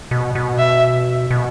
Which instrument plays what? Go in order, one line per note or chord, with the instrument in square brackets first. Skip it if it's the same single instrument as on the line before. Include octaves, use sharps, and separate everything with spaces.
[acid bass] B2
B2
[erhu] E5
[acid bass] B2